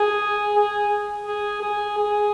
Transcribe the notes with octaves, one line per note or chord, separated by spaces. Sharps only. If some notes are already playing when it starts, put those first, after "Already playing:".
Already playing: G#4
G#4
G#4
G#4
G#4